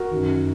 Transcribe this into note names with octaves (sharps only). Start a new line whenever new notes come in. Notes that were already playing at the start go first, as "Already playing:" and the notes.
Already playing: F#4 A#4
F#2 D#3